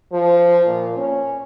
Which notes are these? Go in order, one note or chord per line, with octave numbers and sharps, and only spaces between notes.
F3
A#2
C#4